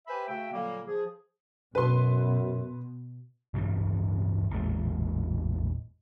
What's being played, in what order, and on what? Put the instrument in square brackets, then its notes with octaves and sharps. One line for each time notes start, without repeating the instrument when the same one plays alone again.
[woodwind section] G4 B4 C5 E5 G#5 B5
C#3 A3 F#4 E5 G5
A#2 D3 F#3 G3 A#3
F3 G#4
[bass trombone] F#2 [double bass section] B2 [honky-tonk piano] B4 C6
[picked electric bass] D1 G2 C#3 E3
A1 E2 A#2 G#3